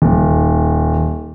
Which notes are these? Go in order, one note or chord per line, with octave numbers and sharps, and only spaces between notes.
D#1